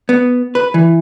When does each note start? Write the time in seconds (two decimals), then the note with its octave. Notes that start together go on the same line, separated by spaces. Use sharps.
0.09 B3
0.55 B4
0.74 E3